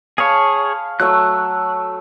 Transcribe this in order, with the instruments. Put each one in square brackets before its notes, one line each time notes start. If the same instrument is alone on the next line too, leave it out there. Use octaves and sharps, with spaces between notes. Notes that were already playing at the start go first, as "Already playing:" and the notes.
[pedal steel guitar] G#4 C#5 [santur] F5 A5 B5
[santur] F#3 A3 E5 [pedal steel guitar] F#6